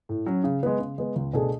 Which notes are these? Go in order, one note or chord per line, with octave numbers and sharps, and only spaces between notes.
A2
F#3 C#4
C#3
G#3 B3
C#3
G#3 B3
C#2
B2 A3 D4 G#4